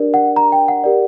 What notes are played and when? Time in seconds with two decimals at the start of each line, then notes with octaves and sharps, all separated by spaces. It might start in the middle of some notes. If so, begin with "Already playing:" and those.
Already playing: D4 G4 A#4 D5
0.14 F#5
0.36 A#5
0.52 G5
0.68 F#5
0.84 G4 A#4 D5